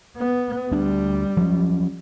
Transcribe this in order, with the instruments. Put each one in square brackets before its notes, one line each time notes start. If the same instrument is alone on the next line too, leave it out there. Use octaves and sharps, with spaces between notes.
[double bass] B3
[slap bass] D2 D4 [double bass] G3
[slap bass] F3 F#3 C#4